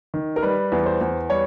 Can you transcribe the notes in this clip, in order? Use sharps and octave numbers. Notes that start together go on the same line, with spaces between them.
D#3
A#4
G3 B4
E2
C5
E2
G3 C#5